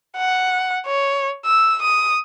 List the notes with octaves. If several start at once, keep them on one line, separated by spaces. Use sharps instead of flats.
F#5
C#5
E6
D#6